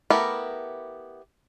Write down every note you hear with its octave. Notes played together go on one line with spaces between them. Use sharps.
A3 B3 E4 G4 A#4